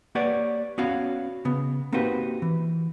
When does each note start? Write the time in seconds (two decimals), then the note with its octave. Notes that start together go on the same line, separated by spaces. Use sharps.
0.15 A#3 G4 B4 C#5 D5 F#5
0.78 B3 C#4 F#4 C#5 F5
1.45 C#3 B3
1.92 A#3 C4 D#4 F#4 G4 B4
2.42 E3